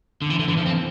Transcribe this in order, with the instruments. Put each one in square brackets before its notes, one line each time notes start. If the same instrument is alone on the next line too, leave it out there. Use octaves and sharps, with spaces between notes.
[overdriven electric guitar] D3
E3
D3
E3
F3
C4